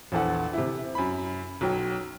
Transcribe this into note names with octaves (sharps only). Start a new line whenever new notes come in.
A#1 E2 A4 F#5
C3 E4
F#2 B5
B1 F#3 G5